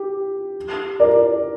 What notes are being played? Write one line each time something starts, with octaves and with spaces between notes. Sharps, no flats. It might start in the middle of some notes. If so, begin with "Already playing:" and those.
Already playing: G4
A#4 D5